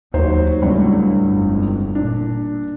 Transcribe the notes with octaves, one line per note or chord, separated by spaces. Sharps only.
D#2 F#3 D#4 C5
C#2 A2 D3 G3
G1 F2
A#2 D4